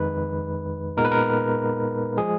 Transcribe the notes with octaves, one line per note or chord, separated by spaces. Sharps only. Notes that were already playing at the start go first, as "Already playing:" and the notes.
Already playing: F2 D#3 G#3 D#4 B4
A#2 G#3 B3 D#4 A#4
B4
A#4
F3 G#3 G#4